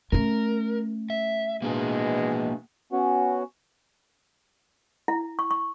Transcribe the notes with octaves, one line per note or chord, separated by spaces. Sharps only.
A3 C#4 A#4
E5
B2 E3 G#3 A#3 D4 G#4
B3 C#4 F#4
E4
C#6
C#6